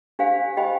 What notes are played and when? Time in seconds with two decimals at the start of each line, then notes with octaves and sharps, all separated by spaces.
0.19 D4 G4 C5 F5 G#5
0.57 G4 C5 D#5 G5 B5